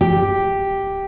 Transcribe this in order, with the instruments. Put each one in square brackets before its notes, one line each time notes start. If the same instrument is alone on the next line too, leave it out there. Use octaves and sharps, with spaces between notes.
[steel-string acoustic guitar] G4